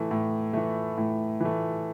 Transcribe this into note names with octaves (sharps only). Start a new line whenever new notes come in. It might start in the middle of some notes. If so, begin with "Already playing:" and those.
Already playing: A2 E3 A3
A2
E3 A3
A2
E3 A3